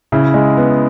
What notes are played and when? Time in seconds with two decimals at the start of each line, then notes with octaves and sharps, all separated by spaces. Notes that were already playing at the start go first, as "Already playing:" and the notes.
0.12 C#3 E4
0.34 G#3
0.57 B3